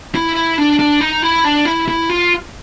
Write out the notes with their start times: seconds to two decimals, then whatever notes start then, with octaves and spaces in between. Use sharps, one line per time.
0.15 E4
0.36 E4
0.58 D4
0.79 D4
1.01 D#4
1.23 E4
1.44 D4
1.65 E4
1.88 E4
2.10 F4